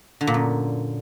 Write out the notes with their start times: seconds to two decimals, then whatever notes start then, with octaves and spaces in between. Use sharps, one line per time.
0.21 D3
0.27 A#2
0.34 F#2